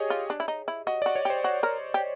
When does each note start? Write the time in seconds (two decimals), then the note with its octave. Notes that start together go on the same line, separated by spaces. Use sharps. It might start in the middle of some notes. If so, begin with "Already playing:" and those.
Already playing: G4 G#4 C#5 D#5
0.10 F4
0.30 D4
0.40 E4
0.48 D#4
0.68 E4
0.87 F#4 D#5
1.02 D5
1.06 F#4
1.15 C#5
1.25 G4 C5
1.44 F#4
1.63 A#4
1.94 G4